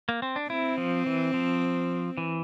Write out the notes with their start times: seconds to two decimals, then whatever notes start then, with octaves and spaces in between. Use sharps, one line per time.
0.09 A#3
0.22 C4
0.36 D4
0.50 C4 E4
0.78 F3
1.06 E3
1.34 F3
2.18 E3